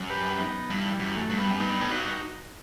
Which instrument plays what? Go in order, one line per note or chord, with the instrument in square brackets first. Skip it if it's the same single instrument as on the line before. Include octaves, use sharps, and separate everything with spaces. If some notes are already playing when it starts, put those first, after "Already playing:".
Already playing: [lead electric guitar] F#2
[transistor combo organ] G4 B4
B3 D#4
[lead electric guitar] G2 [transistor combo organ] E3
[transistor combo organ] E3 G3
[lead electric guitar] F#2
[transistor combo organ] F#3 A3
[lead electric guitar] G2
[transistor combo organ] G3 B3
[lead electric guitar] F#2
[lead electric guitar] G2 [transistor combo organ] B3 D#4
[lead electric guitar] A2
[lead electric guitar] G2 [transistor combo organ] D#4 F#4